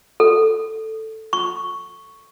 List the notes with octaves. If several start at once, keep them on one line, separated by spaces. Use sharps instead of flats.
A4
C#6